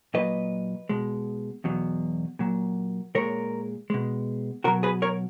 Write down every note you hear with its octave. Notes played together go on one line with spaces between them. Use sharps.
A#2 F#3 B4 D#5
B2 G#3
E2 B2 F#3
A#2 F#3
A#2 G#3 A#4 C#5
B2 G#3
B2 F#3 F#4 A#4
G#4 B4
A#4 C#5